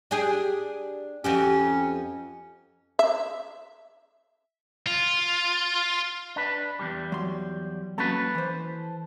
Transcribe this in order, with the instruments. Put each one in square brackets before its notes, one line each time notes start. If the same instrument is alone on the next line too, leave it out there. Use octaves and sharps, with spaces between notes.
[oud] D4 G4 G#4
[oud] F2 F#4 G4 [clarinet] C#4
[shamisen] E5
[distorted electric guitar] F4
[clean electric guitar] D4 B4
E2 G2 G3
[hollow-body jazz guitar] F#3 C6
[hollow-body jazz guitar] F#3 A#3 C#4 [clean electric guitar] A4 B4
[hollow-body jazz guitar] E3 C5